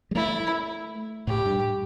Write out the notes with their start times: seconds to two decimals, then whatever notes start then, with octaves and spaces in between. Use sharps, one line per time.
0.11 G3
0.15 A3 E4
1.27 A2 G4
1.46 G2